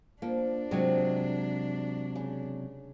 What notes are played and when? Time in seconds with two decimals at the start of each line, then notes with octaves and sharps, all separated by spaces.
0.22 F3 A#3 D4
0.71 C3 F#3 G#3 C4 C#5
2.15 C#3